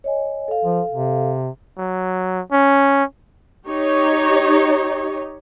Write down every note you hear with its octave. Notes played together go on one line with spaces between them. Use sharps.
C#5 D#5 G#5
A4 F5
F3
C3
F#3
C#4
D#4 G4 C#5